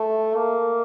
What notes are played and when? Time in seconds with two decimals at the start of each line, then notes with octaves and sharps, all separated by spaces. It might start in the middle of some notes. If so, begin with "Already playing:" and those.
Already playing: A3
0.35 A#3